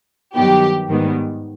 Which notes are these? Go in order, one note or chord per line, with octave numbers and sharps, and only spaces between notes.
G2 D#3 F#3 B3 G4
G#2 D#3 G3 B3